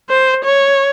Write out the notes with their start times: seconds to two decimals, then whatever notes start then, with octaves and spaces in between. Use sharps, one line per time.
0.10 C5
0.45 C#5